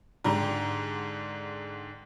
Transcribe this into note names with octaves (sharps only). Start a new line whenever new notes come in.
G#2 D3 G4 A#5